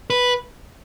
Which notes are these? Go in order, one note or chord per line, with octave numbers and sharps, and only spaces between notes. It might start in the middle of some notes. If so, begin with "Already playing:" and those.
B4